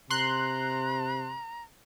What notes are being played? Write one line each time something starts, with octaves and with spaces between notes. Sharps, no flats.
C3 A#5 C6 F#6